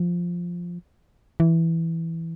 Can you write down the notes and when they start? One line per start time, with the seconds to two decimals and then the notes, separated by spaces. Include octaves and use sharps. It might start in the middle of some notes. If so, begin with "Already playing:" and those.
Already playing: F3
1.40 E3